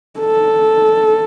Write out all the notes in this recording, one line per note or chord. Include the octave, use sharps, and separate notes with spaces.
A4